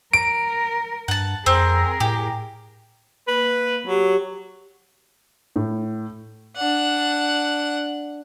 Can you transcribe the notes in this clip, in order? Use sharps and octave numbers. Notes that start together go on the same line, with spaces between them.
A#4 D7
G2 F#5 A5
F2 C4 G#4 A#4
A2 G4
A#3 B4
F#3 G4
A2
D4 F#5